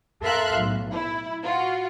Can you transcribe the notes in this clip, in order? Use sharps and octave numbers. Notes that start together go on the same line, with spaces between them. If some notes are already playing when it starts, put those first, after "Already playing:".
A4 A#4 E5 F5 C6 F#6
B1 A2
E4
F4 F#4